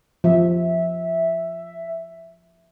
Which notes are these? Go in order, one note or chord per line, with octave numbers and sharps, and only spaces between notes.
F3 E5